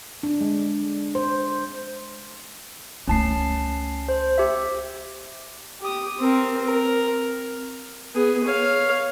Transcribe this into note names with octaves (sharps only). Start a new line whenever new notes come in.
D4
G#3
C5
C#2 A3 C#4 A5 C7
C5
G4 E5
G4 D#6
C4 A#4
A#4
B3 G#4
C#5 F5